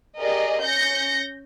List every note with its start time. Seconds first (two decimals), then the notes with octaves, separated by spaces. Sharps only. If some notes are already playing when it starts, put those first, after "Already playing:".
0.17 G4 G#4 A#4 D5 D#5
0.61 C#4 G6 A#6 C#7